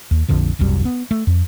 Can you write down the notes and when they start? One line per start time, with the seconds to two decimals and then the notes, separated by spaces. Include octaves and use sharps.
0.11 D#2
0.29 A#1 F2 D3 F3
0.59 D#1 C2 F#2 G3
0.85 B3
1.11 A3
1.27 F2